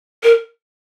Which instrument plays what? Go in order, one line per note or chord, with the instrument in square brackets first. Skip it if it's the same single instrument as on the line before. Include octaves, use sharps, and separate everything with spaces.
[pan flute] A#4